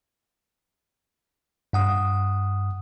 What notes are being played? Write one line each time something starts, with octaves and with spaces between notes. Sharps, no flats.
G2 F#5 D#6